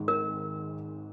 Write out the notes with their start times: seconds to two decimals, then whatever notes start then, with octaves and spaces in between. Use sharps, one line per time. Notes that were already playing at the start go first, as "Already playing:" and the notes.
Already playing: G#1 G#2 D#3 G#3
0.08 A#4